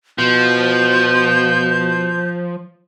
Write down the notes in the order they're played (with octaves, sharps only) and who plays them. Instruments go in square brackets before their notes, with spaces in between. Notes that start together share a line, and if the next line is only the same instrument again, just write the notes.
[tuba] B2 [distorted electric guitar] F3 [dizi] G6